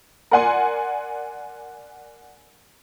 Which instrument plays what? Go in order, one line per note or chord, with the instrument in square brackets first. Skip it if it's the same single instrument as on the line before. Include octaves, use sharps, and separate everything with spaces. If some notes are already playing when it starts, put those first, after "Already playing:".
[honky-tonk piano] A#4 D5 F#5 G#5 C6